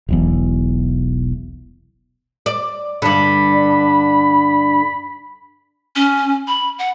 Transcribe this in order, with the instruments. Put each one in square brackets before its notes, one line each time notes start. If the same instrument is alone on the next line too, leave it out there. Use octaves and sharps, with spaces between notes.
[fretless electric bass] E1 B1 E2
[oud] D5
[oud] G2 D3 [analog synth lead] B5
[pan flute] C#4
B5
F#5